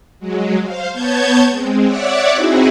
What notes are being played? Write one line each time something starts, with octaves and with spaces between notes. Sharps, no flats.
F#3 G#3
C5 F5
B3 C#5 A5 G6 G#6
G#3 C4
C#5 D5 E5 F#5 D6
C4 D#4 E4 F#4 G#4